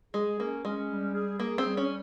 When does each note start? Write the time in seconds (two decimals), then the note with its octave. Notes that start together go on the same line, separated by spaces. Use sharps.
0.14 G#3 G#4
0.39 A#3 C#4
0.64 G#3 C#4
0.90 G3
1.14 G#4
1.39 A#3 G#4
1.58 C4
1.65 G3
1.77 C#4